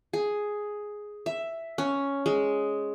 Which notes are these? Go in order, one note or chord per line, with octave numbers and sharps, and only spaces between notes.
G#4
E5
C#4
G#3